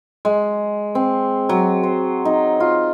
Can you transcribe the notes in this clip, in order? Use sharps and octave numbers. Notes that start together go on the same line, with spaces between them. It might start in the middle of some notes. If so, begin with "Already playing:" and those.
G#3
C4
F#3
C5
D#4
F4